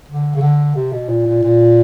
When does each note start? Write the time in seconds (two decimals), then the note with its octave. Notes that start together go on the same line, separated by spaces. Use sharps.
0.08 D3
0.35 C#3
0.41 D3
0.76 C3
0.92 B2
1.09 A#2
1.26 A#2
1.43 A#2